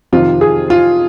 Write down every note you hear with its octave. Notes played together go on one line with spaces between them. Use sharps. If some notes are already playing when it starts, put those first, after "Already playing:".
F2 C3 D#3 F4
G#4
F4